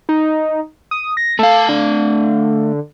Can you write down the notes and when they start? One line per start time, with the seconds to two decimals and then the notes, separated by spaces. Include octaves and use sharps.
0.09 D#4
0.91 D#6
1.17 A#6
1.39 A3 A4 F5
1.69 D3